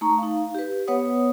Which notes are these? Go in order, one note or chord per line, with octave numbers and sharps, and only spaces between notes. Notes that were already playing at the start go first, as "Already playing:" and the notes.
A3 D#4 A#5 C#6
D#4 F5
G4 B4
B3 B4 C#5 F#5 D#6